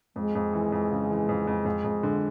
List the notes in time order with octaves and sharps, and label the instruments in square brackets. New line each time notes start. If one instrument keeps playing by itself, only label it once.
[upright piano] F2 [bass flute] G#3
[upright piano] F2
E3
F2
C#3
E3
F2
F2
F2
F2
D3